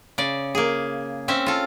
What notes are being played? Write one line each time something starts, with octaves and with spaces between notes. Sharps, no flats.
C#3 D5
A#3 G#4
C4 C#4 E5
F4 A4